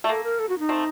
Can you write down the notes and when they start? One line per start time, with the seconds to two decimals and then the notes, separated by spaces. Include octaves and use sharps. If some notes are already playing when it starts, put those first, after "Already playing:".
0.04 A3
0.09 A#3 A4
0.24 A#4
0.39 A4
0.49 F#4
0.59 D#4
0.69 A3 C4